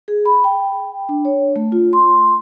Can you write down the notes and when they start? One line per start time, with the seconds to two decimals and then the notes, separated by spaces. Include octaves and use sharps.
0.08 G#4
0.25 B5
0.44 G5
1.09 D4
1.25 C#5
1.56 A3
1.72 F4
1.93 C6